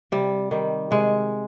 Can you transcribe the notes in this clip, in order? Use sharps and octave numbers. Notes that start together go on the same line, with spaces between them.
C3 G3
D#3 G3
C3 G#3